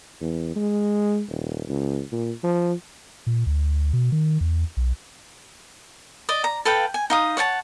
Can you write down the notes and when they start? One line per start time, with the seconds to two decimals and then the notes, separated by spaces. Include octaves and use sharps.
0.21 E2
0.56 G#3
1.29 D#1
1.69 C#2
2.12 A#2
2.44 F3
3.27 A#2
3.47 D2
3.93 B2
4.12 D#3
4.41 E2
4.77 B1
6.29 D5 D#5
6.44 A#5
6.65 A4 B4 F5 G5
6.94 G#5
7.10 D#4 F5 D#6
7.37 C#5 F#5 G5 A5